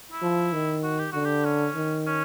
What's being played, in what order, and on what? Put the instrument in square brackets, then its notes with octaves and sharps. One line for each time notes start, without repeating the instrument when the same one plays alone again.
[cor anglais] E4
[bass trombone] F3
D#3
[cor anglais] F#4
G4
[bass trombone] D3 [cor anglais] F#4
[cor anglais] G4
C#4
[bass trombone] D#3
[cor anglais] C#4